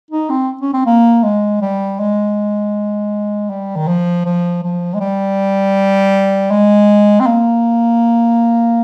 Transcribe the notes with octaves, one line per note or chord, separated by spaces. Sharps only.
D#4
C4
C#4
C4
A#3
G#3
G3
G#3
G3
D#3
F3
F3
F3
G#3
G3
G#3
C4
A#3